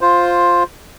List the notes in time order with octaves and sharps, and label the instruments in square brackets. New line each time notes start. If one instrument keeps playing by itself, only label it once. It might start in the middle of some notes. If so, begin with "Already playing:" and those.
[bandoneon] F4 C5